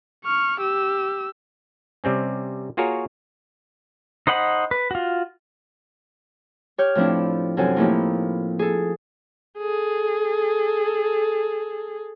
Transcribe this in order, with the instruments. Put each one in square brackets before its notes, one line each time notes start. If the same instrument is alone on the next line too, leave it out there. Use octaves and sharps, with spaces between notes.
[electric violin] C#6 F6
G4 E6
[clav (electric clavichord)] C3 G3 C4 C#4
A#3 F4 F#4 G#4 A#4 C#5
[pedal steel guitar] D#4 C5 D#5 F#5 B5
B4
F4 F#4
[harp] G4 C#5 F6 G6
A2 F3 C4 D4 E4
F#2 C3 C4 A4 G#5
A2 F3 A#3 D#4 E4 G4
G#4 A4
[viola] G#4 A4